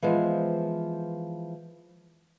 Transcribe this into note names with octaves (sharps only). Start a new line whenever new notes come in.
E3 F3 G#3 B3 C5